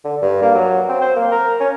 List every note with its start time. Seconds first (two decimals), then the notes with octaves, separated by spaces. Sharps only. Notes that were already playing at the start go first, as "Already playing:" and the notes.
0.04 D3
0.22 G2
0.42 A#3
0.55 F#3
0.89 C4
1.01 C5
1.16 A#3
1.31 A#4
1.60 C#4